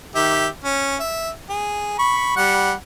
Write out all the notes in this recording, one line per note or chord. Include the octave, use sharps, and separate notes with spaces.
D#3 G4 E5
C#4
E5
G#4
B5 C#6
G3 F#5